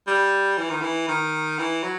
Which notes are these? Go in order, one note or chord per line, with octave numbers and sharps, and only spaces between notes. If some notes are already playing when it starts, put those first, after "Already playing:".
G3
E3
D#3
E3
D#3
E3
F#3